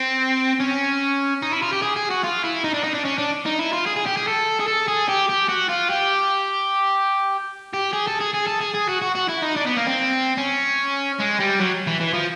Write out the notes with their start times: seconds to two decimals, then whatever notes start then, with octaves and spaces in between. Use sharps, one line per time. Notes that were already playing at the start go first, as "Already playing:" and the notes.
Already playing: C4
0.60 C#4
1.42 D#4
1.52 E4
1.62 F4
1.72 G4
1.82 G#4
1.96 G#4
2.10 F#4
2.23 F4
2.44 E4
2.64 D#4
2.74 D4
2.84 D#4
2.94 D4
3.05 C#4
3.18 D4
3.46 D#4
3.59 E4
3.72 F4
3.86 G#4
3.96 G#4
4.06 G4
4.17 G#4
4.27 A4
4.60 G#4
4.68 A4
4.88 G#4
5.09 G4
5.29 G4
5.49 F#4
5.69 F4
5.90 G4
7.73 G4
7.93 G#4
8.07 A4
8.21 G#4
8.34 G#4
8.48 A4
8.61 G#4
8.74 G#4
8.89 F#4
9.02 F#4
9.15 F#4
9.29 E4
9.42 D#4
9.57 D4
9.67 B3
9.77 A#3
9.87 C4
10.37 C#4
11.19 G#3
11.40 G3
11.59 F#3
11.87 E3
12.01 E3
12.14 F3